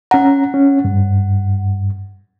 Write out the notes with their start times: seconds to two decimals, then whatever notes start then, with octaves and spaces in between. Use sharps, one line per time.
0.11 C#4 F#5 A#5
0.54 C#4
0.85 G2